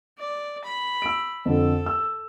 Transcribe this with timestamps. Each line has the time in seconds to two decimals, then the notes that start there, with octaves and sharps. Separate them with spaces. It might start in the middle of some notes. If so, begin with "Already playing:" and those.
0.18 D5
0.64 B5
1.02 E6 D7
1.45 F2 D3 A4
1.86 E6